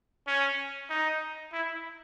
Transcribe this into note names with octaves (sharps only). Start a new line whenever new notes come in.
C#4
D#4
E4